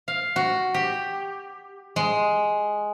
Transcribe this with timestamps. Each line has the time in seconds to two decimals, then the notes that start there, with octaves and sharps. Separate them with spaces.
0.08 F5
0.36 F#4
0.74 G4
1.96 G#3